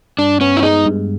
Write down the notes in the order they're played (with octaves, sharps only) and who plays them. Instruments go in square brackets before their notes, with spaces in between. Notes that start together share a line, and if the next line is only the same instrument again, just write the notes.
[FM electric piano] G2 [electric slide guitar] D4
[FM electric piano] B3 [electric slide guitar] C#4
[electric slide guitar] E4
[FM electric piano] G#3 [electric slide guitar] D#4
[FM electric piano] G2